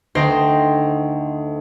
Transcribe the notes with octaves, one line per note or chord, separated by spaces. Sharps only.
D2 D#4 C5 G5 C6 A#6